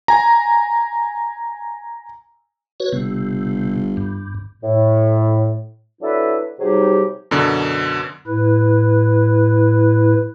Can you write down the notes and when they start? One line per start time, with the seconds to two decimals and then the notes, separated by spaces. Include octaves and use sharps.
0.08 G#5 A#5
2.80 F#4 B4 C#5
2.92 G1 C3
3.97 G2
4.63 A2
6.02 F#3 D4 E4 A4 B4 E5
6.60 C3 F#3 G3 D#4 G4 G#4
7.31 F#2 B2 D3
8.27 A2 E4 B4